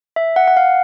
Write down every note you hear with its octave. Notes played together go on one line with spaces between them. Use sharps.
E5
F#5
F#5
F5